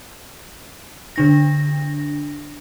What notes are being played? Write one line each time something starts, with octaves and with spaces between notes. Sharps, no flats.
D3 D4 A#6